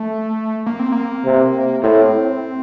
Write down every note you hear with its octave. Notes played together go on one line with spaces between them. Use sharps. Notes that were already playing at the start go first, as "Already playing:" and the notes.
Already playing: A3
A#3
C4
A#3
C3
A2 C4